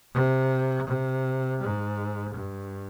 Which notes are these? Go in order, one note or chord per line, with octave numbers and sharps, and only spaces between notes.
C3
C3
G#2
G2